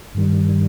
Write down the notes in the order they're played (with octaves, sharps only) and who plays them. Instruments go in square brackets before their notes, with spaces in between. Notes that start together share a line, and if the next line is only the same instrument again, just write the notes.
[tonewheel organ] G2 D#3 G3